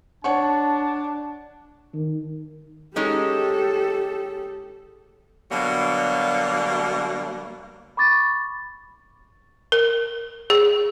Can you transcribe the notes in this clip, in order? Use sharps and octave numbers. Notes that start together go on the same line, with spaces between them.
D4 C#5 F#5 A5 C#6
D#3
G#3 C#4 D#4 G4 A4
B2 D3 F#3 G3 A#3
B5 C#6 D6 A6
A#4
G#4